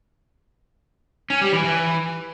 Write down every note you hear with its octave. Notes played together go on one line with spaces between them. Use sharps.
C#4
G3
E3
E3